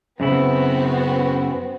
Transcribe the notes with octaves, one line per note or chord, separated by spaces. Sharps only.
F#2 C#3 B3 C4 E4 F#4